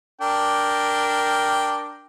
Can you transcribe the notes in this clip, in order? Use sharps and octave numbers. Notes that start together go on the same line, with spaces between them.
D4 A#4 G5